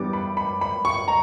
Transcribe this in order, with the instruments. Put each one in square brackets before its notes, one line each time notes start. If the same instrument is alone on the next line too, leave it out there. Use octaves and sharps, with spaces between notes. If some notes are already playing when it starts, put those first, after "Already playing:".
Already playing: [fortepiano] G2 E3 G3 B3 [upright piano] D6
[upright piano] B5
B5
B5
C#6
A#5